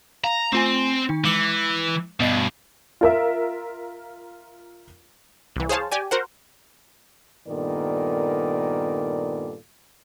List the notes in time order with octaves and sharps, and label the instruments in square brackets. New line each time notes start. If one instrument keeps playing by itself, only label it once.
[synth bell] F5 [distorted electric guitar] A#5
[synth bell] A3 F4 G#5 [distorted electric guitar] C4
[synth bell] D#3 D#4
[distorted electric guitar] E3 [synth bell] G#3 D6 C#7
[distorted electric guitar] G2 B2 [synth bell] B3 D#5 C7
[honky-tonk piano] F4 A#4 E5
[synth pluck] C2 E3
G#4 C5 C#5 F5 A5
G4 D5 G#5
F#4 A#4 C5 F#5
[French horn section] G2 A#2 D#3 B3 A4 D5